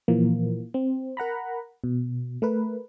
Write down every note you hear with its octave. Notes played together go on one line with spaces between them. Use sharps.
A#2 E3 F3 A#3
C4
A#4 F#5 A#5 B5
B2
A3 A#4 B4